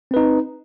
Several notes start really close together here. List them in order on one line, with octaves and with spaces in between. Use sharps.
C4 B4 D#4